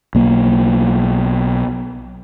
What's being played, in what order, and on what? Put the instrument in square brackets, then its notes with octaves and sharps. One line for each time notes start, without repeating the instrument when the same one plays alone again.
[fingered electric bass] B1 A#3